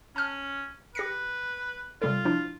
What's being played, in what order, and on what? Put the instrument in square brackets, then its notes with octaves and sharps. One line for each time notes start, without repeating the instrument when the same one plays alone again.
[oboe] C#4 [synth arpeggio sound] A5 F6
[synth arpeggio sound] G4 A#6 C#7 [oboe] B4
[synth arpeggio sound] C3 G3 A4 [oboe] F4
[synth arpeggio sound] F3 D4 E4